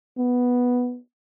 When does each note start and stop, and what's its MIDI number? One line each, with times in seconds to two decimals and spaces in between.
0.17 0.98 59